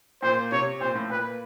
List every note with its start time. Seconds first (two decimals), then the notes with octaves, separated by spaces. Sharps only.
0.23 A#2 C5
0.52 C3 C#5
0.81 A#2 C5
0.95 A2
1.10 A#2 B4